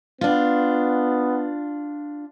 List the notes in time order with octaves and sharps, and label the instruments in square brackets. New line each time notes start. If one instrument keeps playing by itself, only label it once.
[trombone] B3 [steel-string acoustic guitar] D4 F4